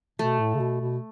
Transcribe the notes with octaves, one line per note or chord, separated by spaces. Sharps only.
B2 A3
A2
C#3
B2
B2